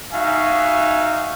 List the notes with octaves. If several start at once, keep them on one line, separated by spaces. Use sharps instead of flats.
D#4 F#4 E5 F5 G#5